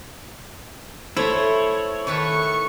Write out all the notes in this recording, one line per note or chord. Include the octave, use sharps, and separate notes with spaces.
A3 E4 C5 C#5 E5
D#3 A4 B4 C#6